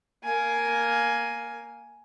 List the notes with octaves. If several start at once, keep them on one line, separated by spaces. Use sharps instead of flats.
A#3 G#5